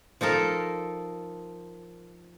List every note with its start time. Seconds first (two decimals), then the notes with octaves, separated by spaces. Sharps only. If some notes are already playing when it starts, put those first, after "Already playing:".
0.21 F3 D#4 A4 A#4